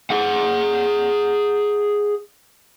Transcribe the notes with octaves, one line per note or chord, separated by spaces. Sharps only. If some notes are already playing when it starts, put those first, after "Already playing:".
G#4 F#5